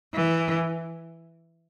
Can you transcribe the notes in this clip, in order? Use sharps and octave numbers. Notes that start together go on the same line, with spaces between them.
E3